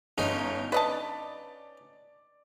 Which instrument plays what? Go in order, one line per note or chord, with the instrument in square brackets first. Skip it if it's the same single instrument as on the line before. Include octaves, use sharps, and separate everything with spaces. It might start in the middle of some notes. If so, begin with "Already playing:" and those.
[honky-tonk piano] G1 [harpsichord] C#4 D#4 F4
[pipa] B4 D#5 A5 [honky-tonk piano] D5